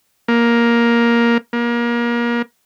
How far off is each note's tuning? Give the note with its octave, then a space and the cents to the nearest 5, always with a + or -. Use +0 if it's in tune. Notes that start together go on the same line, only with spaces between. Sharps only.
A#3 +10
A#3 +30